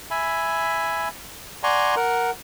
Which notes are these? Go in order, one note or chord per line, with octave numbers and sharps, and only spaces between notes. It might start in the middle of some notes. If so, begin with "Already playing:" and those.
E5 G#5 B5
D5 F#5 G#5 A#5 C6 C#6
A#4 F#5